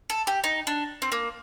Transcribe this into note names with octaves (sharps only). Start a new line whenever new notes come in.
A4
G4
D#4
D4
C4
A#3